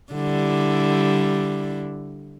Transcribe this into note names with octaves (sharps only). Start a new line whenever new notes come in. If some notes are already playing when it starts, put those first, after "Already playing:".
D3 G3 E4